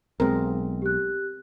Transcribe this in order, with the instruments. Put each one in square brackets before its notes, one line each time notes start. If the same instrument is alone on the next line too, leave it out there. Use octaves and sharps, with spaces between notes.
[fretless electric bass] B1 G#3 [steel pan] C4 A#4
[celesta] G4 F#6